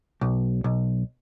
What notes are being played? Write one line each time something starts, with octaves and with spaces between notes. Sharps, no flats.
B1
B1